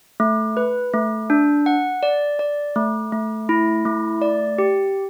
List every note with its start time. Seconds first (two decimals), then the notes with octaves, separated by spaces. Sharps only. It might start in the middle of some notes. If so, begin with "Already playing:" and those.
0.20 A3
0.57 B4
0.93 A3
1.30 D4
1.66 F#5
2.03 D5
2.39 D5
2.76 A3
3.12 A3
3.49 E4
3.85 A3
4.22 D5
4.58 G4